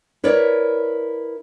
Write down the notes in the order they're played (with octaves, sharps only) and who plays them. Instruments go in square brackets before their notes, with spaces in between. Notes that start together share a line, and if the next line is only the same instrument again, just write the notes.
[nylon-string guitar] E4 A#4 B4 C#5 D5